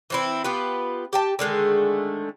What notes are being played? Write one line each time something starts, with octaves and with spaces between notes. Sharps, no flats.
E3 C4 E4
B3 F4 G4 B4
G4 G5 A5
D3 D#3 G#3 A3